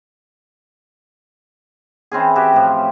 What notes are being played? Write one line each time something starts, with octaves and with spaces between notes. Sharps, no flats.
E3 C4 C#4 G#4
F#4 G4 E5
A2 F3